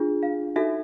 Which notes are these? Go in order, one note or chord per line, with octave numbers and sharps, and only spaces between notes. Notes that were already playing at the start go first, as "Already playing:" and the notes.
Already playing: D4 F4 G#4
F5
D#4 F#4 A4 E5